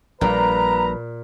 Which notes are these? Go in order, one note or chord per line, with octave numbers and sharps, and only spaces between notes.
A#1 A#2 G3 B4 A#5